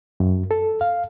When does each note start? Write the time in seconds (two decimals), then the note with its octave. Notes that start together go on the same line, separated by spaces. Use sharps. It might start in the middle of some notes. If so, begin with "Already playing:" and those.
0.20 F#2
0.51 A4
0.81 F5